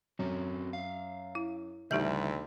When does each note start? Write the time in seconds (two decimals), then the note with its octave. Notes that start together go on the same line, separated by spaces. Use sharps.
0.19 F#2 C4 F#4 C#5
0.73 E5 F5
1.35 E4
1.91 D2 C#3 E3 G3 D#4 G4 E5 G6